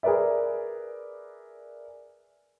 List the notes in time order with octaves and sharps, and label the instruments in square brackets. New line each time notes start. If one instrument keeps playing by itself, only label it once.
[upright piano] G#4 A#4 B4 D5 E5